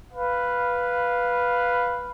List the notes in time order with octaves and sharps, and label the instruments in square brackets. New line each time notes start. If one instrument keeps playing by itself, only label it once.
[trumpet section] B4 F5